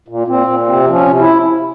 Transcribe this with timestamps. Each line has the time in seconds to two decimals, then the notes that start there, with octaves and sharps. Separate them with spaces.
0.08 A#2
0.27 A#2 C4
0.47 A#2
0.67 C3 C4
0.87 F3
0.93 C#4
1.07 C3
1.19 E4